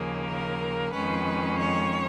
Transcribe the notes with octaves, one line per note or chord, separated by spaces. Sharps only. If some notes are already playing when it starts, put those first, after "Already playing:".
Already playing: D#2 C#3 F3 A#3 G#4
A#4
F2 D#3 G#3 C#4 B4
C#5